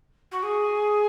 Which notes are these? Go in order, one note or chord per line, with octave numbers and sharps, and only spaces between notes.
F#4
G#4